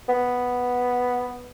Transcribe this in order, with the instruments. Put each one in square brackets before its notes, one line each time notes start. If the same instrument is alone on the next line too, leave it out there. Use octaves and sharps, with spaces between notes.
[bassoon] B3